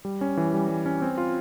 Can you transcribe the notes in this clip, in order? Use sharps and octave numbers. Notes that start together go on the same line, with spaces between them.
G3
C#4
E3
G3
G3
C#4
C4
F4